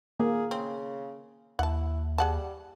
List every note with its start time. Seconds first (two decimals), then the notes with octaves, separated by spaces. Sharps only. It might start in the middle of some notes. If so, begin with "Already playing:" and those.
0.20 A#3 G#4
0.51 C#3 C4
1.59 D#2 E4 F#5 A5
2.18 G3 G#4 F#5 A5